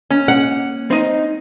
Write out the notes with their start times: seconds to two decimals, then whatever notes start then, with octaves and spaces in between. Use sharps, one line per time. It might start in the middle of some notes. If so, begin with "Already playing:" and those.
0.10 A#3 C#4
0.28 A#3 F#5
0.91 C4 D#4 D#5